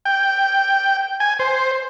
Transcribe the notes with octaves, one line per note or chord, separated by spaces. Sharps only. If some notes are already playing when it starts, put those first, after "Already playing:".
G5
G#5
C5